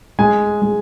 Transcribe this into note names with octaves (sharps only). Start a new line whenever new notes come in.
G#3 G#5
G#3